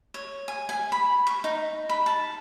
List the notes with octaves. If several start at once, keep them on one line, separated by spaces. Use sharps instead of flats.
C#5
G#5
G#5
B5
C#6
D#4
B5
A5